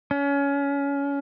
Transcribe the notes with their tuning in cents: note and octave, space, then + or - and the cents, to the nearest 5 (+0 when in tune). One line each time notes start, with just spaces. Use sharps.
C#4 +25